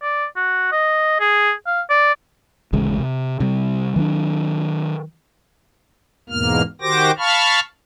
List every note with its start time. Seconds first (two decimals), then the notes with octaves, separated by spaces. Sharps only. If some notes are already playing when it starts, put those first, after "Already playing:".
0.02 D5
0.36 F#4
0.72 D#5
1.20 G#4
1.67 F5
1.90 D5
2.73 D1 A1 C#3 G#3
2.99 C3
3.40 C3 G3
3.96 D#3 F#3 C#4 D4
6.30 E2 G#2 B2 A#3 F6
6.82 D#3 F#4 G4 C5 D6 A#6
7.18 F5 A5 B5 C#6 F6